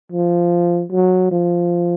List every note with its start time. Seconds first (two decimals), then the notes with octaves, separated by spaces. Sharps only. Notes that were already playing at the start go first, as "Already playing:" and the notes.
0.12 F3
0.92 F#3
1.31 F3